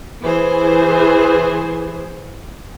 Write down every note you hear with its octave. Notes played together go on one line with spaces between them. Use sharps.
E3 G#4 C5